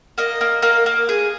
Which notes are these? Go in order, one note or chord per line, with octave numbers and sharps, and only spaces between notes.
A#3 D#5
A#3
A#3
A#3
G#4